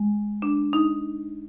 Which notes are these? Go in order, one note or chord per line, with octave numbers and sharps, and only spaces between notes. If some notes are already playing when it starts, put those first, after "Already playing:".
Already playing: G#3
D4
D#4